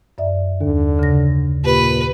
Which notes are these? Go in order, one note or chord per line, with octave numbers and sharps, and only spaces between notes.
F#2 D5 E5
D#2 D3
C#3 A#6
A#2 G4 B4 B5